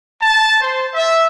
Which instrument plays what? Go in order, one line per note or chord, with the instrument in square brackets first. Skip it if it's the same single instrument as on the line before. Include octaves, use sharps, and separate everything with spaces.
[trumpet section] A5
C5
E5